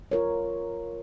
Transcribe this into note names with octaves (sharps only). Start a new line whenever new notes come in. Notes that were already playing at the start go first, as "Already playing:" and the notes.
F4 A#4 C#5